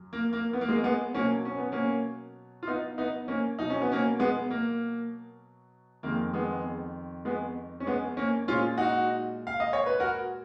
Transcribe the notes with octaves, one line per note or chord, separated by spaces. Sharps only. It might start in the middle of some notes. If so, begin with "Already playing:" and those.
Already playing: F#2
A#3
A#3
B3
A#3
G#3
A#3
G#3 B3
B2 F#3 A#3 C#4
C#4
B3
A#3 C#4
F4
B3 D#4
B3 D#4
A#3 C#4
B2 F#3 D#4
C#4
B3
A#3 C#4
G#3 B3
A#3
F2 D#3 G#3 A#3
G#3 B3
G#3 B3
C#4
G#3 B3
A#3 C#4
A#2 G#3 C#4 F4
D#4 F#4
F5
D#5
C#5
B4
F#4 A#4